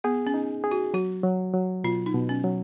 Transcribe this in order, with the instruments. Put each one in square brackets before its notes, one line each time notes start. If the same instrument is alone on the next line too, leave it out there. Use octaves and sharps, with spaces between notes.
[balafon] B3 [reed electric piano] G#4
[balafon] C#4
[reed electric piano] D#4
G#4
[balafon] F#4
[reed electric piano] F#3 [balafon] F#4
[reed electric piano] F#3
F#3
[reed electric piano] B2 [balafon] F4
[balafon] D#4
[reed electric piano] B2
[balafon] C#4
[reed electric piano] F#3